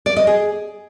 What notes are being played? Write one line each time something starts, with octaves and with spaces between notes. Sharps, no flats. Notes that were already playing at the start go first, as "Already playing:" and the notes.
D5
D#5
G#4